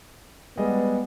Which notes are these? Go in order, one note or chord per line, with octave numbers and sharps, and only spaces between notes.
G3 G#3 B3 D#5